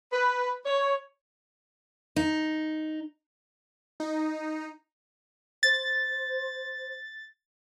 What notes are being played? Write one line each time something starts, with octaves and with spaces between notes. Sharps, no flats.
B4
C#5
D#4
D#4
C5 A6